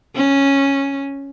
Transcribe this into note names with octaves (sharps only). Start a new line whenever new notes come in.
C#4